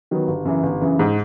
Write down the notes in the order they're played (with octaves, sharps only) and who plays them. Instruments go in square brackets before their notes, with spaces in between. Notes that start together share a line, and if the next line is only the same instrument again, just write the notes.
[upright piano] D#3 F#3 B3
G1
F#2 C#3 E3
G1
F#2 C#3 E3
G#2